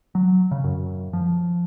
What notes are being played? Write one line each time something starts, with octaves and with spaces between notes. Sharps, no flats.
F#3
C#3
F#2
F3